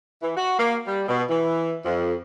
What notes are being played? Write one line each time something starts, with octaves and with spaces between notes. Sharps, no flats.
E3
F#4
A#3
G3
B2
E3
F2